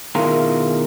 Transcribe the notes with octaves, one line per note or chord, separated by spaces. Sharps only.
B2 D#3 E4 F4 G#4 A#4